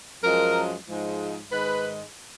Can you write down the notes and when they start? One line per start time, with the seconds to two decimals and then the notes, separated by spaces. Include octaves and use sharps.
0.24 F#2 F3 G#3 A#4
0.88 G#2 F3 G#3
1.51 G#2 D#3 G#3 B4